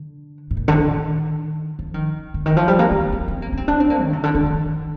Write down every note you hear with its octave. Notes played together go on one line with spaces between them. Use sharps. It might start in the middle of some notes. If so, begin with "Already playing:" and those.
Already playing: D3
A2
A#2
D3
D#3
F3
D#3
D3
D#3
F3
G3
A#3
A#3
A#3
C4
C4
A#3
D4
C4
D4
C4
A#3
D#3
C3
D3
D3
D#3